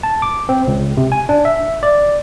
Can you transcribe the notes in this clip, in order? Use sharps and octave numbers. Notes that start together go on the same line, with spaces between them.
A5
D6
C4
C#2
C3
G#5
D4
E5
D5